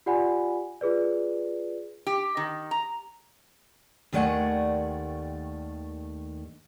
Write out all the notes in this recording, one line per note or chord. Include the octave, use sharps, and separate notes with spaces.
F4 G4 D5 F#5 G#5 B5
F4 G#4 B4 D5
G4
D#3
A#5
D#2 D#3 A3 D5 F#5 G#5